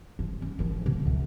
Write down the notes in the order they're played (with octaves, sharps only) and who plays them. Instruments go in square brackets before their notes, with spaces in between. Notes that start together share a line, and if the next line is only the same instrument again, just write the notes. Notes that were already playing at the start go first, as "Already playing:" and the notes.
[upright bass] F3
C#4
D#3 F3
D2 B2
C#2 F#2